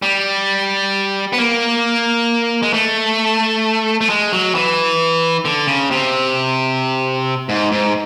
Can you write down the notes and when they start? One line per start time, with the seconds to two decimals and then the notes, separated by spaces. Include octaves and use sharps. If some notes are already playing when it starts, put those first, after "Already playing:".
0.02 G3
1.33 B3
1.38 A#3
2.62 G#3
2.74 A3
4.01 A3
4.10 G#3
4.33 F#3
4.55 E3
5.45 D3
5.67 C#3
5.91 C3
7.49 G#2
7.72 G#2